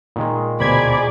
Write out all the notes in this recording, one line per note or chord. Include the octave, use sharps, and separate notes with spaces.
A#2 D#3 G#3
D2 B2 G#4 C5 D5 B5 G#6